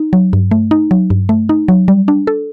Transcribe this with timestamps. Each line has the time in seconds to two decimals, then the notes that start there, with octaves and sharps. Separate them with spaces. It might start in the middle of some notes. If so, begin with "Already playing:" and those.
Already playing: D#4
0.13 F#3
0.33 G2
0.51 A3
0.71 D#4
0.91 F#3
1.10 G2
1.29 A3
1.49 D#4
1.68 F#3
1.88 G3
2.08 D4
2.27 A4